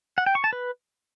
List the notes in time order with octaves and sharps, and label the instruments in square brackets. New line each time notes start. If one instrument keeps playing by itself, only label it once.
[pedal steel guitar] F#5
G5
C#6
A5
B4